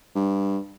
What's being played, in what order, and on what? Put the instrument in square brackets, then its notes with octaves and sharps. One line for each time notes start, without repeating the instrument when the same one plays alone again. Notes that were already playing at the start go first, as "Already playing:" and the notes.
[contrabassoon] G2